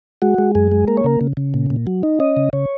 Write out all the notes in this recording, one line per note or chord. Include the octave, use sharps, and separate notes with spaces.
G#3 F#4
G#3
F#2 G#4
G#3
A#3 A#4
C#5
C#3 A#4
C#3
C#3
A#2
A#2
F#3
D#4
C#4 D#5
C#3
C#3 C#5